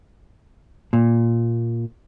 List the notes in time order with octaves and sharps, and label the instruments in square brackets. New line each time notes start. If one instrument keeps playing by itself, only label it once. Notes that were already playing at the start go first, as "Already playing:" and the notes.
[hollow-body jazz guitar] A#2